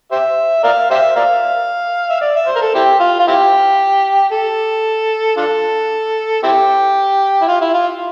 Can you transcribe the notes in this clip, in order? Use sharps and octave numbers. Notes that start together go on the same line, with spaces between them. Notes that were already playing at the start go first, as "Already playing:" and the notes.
G4 C5 E5
A#4 D5 F5
G4 C5 E5
A#4 D5 F5
E5
D5
E5
C5
A#4
A4
C4 E4 G4
F4
F4
C4 E4 G4
A4
D4 F4 A4
C4 E4 G4
E4
F4
E4
F4